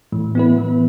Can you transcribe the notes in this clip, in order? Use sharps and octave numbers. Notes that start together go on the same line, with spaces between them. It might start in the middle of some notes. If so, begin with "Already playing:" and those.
A2 E3
B3 E4 B4
E3